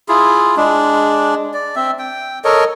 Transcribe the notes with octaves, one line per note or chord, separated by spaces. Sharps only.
E4 F4 G#4
G#3 D4
D5
C4 E5
G5
A4 A#4 C#5 D#5